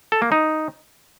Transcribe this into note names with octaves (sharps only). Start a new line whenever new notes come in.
A4
A#3
D#4